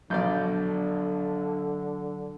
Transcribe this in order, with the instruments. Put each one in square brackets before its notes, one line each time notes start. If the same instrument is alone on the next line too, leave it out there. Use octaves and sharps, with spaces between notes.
[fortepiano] A#1 B2 D5 [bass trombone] D3 [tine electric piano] F#3 G6